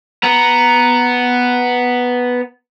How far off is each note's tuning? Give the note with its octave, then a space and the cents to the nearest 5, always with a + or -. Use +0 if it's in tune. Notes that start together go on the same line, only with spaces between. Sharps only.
B3 +0 A#5 +0